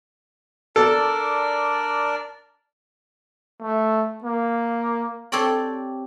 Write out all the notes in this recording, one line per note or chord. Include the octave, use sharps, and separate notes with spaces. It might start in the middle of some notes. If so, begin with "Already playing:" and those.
D4 A4 A#4 D5
A3
A#3
C4 G4 A4 C#5 D5